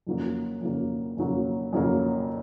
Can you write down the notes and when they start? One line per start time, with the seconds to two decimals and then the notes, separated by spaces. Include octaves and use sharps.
0.07 F2 C#3 F#3 A#3
0.61 F2 C#3 F#3 A#3
1.17 F2 C#3 F#3 A#3
1.73 F2 C#3 F#3 A#3